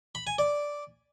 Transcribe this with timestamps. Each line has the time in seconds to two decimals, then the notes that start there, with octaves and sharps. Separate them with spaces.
0.15 B5
0.27 G#5
0.38 D5